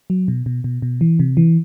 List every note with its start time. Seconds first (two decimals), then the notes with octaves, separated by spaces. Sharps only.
0.10 F#3
0.28 B2
0.46 B2
0.64 B2
0.82 B2
1.01 E3
1.20 C3
1.37 E3